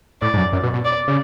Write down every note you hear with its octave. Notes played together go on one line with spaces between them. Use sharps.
A2 D5
G#2
F#2
F#2
B2
B2
D5
C#3